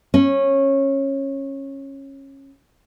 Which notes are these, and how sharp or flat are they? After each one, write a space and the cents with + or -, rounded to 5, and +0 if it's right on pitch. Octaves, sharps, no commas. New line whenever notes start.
C#4 -20